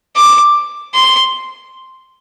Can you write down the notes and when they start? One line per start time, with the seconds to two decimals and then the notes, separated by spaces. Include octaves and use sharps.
0.16 D6
0.94 C6